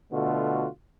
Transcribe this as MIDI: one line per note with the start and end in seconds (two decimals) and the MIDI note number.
0.13 0.68 47
0.13 0.68 50
0.13 0.68 57
0.13 0.68 65
0.13 0.68 66